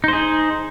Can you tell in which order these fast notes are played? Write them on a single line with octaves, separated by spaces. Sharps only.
D#4 C5 G#4